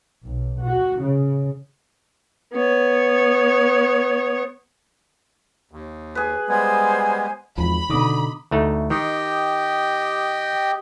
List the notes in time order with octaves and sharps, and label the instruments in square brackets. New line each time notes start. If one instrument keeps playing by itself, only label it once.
[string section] B1
F#4
C#3
[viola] B3 C#5
[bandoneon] D#2
[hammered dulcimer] G#4 B4
[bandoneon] G3 G#3 B3 [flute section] C5 G#5 G#6
[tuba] G#1 [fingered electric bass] E2 F3 [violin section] B5
[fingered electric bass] B2 D#3 [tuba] D3 [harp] D#4 D6 D#6
[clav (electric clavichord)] D2 A3 D#4
[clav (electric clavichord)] D#3 [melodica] G4 D#5 G5